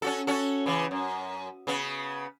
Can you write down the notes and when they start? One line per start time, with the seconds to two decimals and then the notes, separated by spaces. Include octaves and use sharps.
0.02 C#4 F#4 A4
0.27 C#4 F#4 A4
0.66 C#3 E3
0.91 F#2
1.67 C#3 B3